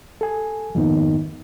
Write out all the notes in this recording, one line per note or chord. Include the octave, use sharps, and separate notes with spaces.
A4 G#5
F2 G#2 D#3 A#3 B3 D#4